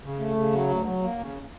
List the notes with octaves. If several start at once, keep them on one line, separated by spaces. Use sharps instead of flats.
C#3
A3
C#3
F#3
D2
F#3
A#3
C#3